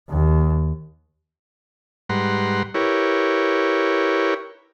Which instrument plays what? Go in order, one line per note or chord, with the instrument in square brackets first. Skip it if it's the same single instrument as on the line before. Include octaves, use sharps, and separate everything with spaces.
[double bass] D#2
[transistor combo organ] G#2 G3 B4 F#5 A#5 C6
E4 G4 A#4 B4 C#5